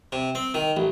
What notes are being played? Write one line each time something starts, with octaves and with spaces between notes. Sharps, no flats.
C3
C4
D#3
A1